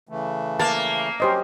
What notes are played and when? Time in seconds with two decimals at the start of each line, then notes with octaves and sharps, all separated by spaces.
0.09 C#3 E3 A3
0.60 A#3 A5
1.20 F#3 C#4 G4 C5 D#5